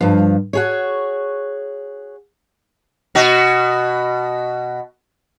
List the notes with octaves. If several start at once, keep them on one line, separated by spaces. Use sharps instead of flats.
G2 F3
F#4 G#4 C#5
B2 F#4